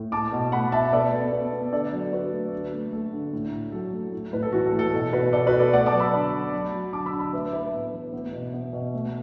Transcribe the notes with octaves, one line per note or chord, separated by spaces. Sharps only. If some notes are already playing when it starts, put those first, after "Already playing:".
Already playing: A2
A3 A5 D6
B2
A3 F#5 B5
B2 E5 A5
B3 A4 D5
B3
B3
B3
D3 A4 D5
F#3
D3 F#4 B4
A3
D3
A3
A3 A4
D3
A2
A2
F#3 A4
A2
A2
A2 B4
A4
E3 F#4
A4
A2
A4
B2 A4
B2 F#4 B4
B2 A4 D5
F#4 B4
B2
A4 D5
A3 D5 F#5
A5 D6
F#3
B5 E6
D3
F#3
F#3
F#3
D3 A5 D6
B5 E6
D3
B5 E6
A2 B4 E5
A2 B4 E5
B3
E3
B3
B2
B3
B2
A3